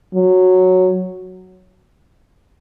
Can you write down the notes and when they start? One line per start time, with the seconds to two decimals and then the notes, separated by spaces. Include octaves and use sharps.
0.15 F#3